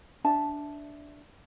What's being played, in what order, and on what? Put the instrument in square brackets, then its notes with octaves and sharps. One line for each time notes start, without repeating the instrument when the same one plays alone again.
[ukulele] D4 D5 E5 A5